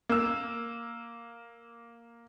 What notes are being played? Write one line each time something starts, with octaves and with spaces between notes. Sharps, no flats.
A#3 E6